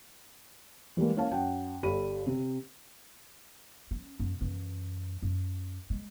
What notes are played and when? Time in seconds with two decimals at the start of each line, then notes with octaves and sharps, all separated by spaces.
0.97 E3 G3 G#3 A#3
1.16 A#3 C#4 E4 C#5 F5 A5
1.31 F#2 F#5 G5 A5
1.83 G1 G3 A4 B5 D#7
2.27 C3
3.91 C#4
4.20 F#2
4.41 F#2 E3
5.22 F#2
5.90 G#3